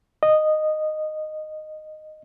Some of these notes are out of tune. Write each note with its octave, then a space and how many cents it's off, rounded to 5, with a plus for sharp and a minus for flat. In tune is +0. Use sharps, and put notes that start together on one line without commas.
D#5 -10